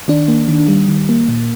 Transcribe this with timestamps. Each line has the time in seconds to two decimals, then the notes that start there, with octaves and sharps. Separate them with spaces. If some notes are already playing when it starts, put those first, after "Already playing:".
0.08 D#3 D4
0.28 A#3
0.48 D#3
0.68 G3
0.88 D#3
1.09 A#3
1.29 A#2